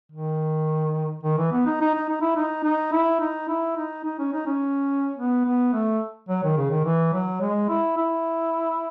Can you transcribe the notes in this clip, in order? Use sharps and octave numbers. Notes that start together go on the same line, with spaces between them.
D#3
D#3
E3
B3
D#4
D#4
D#4
D#4
E4
D#4
D#4
E4
D#4
E4
D#4
D#4
C#4
D#4
C#4
B3
B3
A3
F#3
D#3
C#3
D#3
E3
F#3
G#3
E4
E4